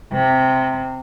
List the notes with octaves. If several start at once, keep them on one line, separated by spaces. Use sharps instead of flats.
C3